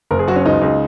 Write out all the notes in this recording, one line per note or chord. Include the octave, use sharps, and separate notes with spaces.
F#1 A#4
G#4
F#3 F#4
C#4
C#2 D#4
C#2